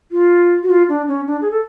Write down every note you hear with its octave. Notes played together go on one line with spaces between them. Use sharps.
F4
F#4
F4
D4
C#4
D4
G#4
A4